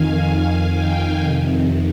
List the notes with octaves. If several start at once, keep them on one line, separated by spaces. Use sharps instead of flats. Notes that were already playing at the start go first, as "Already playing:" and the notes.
Already playing: F2 D#3 F5 G#5
G5
F2 C3 D#3